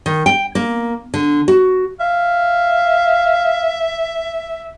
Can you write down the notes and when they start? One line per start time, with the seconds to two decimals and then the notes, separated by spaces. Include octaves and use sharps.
0.06 D#3
0.26 G5
0.55 A#3
1.14 D3
1.48 F#4
2.00 E5 F5